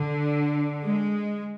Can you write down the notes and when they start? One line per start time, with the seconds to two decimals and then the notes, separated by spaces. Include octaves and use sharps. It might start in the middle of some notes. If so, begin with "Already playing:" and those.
Already playing: D3
0.83 G#3